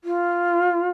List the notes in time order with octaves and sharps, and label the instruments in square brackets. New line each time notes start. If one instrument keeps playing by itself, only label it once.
[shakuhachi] F4